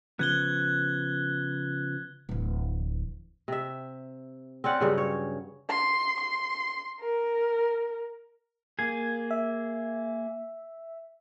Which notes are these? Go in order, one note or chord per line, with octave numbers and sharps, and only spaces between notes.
C#3 F3 B3 F#6 G#6 G7
D1 E3
C3 E5
C4 C#4 D5 F#5
G2 C#3 F#3
C#5
C6
C6
A#4
A#3 G#4 G#6
E5